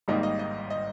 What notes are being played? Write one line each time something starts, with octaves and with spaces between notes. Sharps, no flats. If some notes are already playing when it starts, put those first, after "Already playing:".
G#1 G#2 D#3 G3 A#3 D#5
D#5
D#5
D#5